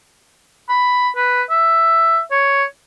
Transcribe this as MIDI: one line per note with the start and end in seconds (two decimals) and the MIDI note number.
0.69 1.09 83
1.16 1.42 71
1.50 2.20 76
2.31 2.64 73